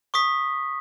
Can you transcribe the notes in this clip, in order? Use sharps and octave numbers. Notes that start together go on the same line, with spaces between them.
C#6 D#6 B6